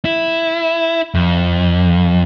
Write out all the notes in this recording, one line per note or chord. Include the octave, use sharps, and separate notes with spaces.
E4
F2